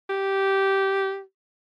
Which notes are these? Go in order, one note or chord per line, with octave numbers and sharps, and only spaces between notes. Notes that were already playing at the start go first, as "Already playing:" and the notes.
G4